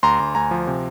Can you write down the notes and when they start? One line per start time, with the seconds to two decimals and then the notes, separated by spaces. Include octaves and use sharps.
0.03 D2 A#5 C6
0.20 D2
0.35 D2 G#5 A#5
0.51 F3
0.67 C3